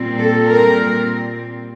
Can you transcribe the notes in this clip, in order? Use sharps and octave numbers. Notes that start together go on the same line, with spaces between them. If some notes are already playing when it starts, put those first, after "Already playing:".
Already playing: A#2 G3 C4
A4
A#4